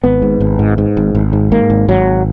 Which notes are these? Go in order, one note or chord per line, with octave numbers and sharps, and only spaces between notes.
G#1 B3
G#2
G#1
G#2
G#2
G#1
G#1
G#2
G#2 A#3
G#1
G#1 F#3